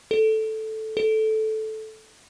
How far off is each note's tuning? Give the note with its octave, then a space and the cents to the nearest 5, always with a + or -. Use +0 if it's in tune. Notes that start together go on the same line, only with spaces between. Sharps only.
A4 -5
A4 -10